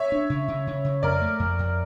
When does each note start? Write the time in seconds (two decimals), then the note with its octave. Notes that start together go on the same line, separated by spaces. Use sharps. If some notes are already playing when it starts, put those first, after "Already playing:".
Already playing: C#5 E5
0.12 D4
0.30 C#3
0.48 C#3
0.67 C#3
0.85 C#3
1.03 F2 A#4 D5
1.22 A3
1.40 F2
1.59 F2